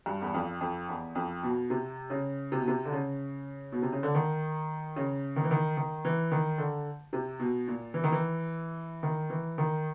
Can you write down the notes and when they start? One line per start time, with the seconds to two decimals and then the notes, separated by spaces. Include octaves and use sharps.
0.06 G2
0.22 E2
0.34 F2
0.61 F2
0.89 E2
1.15 F2
1.43 B2
1.70 C3
2.10 C#3
2.52 C3
2.60 B2
2.68 C3
2.85 D3
2.93 C#3
3.72 B2
3.82 C3
3.92 C#3
4.03 D3
4.15 D#3
4.96 C#3
5.36 D#3
5.44 E3
5.51 D#3
5.77 D#3
6.05 E3
6.32 D#3
6.58 D3
7.13 C3
7.40 B2
7.68 A#2
7.94 E3
8.04 D#3
8.12 E3
9.03 D#3
9.30 E3
9.58 D#3